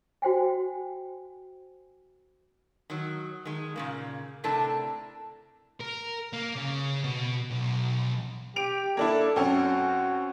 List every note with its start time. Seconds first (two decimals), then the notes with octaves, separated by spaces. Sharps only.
0.22 F#4 C5 G5 G#5
2.90 D#3 F#3
3.45 D#3 G#3
3.76 A#2 C#3 A#3
4.44 A2 C3 D4 A4 A#4 A5
5.80 A#4
6.33 A#3
6.56 C#3
7.04 B2
7.51 B1
8.56 G4 D7 F7
8.97 A#3 D4 E4 A4
9.36 F#2 C4 C#4 F#4